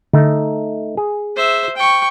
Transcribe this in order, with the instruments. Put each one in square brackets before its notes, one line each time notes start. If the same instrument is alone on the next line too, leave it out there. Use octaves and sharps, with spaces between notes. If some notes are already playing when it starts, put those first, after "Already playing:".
[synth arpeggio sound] D3 [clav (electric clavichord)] A3 D#4
[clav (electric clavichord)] G#4
[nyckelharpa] C5 E5
G5 C#6